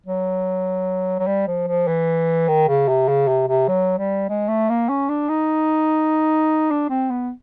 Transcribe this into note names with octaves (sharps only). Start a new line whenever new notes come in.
F#3
F#3
G3
F3
F3
E3
D#3
C#3
C3
C#3
C3
C3
F#3
G3
G#3
A3
A#3
C#4
D4
D#4
D4
C4
B3